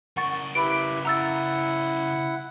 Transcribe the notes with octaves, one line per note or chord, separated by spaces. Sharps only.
C#3 A#4 F#5 C#6 A6
E4 G4 B4 B5 D7
E4 F#5 A#5 E6 A6